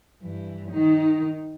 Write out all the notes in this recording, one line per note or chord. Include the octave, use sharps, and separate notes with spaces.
G2 E3
D#3 D#4